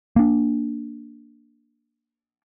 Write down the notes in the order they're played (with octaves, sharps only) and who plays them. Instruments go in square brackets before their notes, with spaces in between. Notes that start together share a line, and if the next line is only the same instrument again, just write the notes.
[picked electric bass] A#3 D4